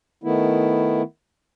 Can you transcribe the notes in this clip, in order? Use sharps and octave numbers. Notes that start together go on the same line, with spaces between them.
D#3 A3 B3 E4